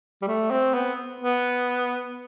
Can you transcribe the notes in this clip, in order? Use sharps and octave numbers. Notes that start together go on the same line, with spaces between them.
G3
A3
C4
B3
B3